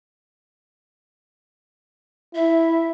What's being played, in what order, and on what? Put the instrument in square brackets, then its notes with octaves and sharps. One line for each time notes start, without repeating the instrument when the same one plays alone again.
[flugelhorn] E4 [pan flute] E5